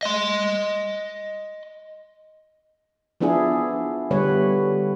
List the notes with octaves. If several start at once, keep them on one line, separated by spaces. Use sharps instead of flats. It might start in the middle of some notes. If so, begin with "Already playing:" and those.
D#5 C6
F3 B3 D4 E4 G#4
D3 G3 B3 B4 C#5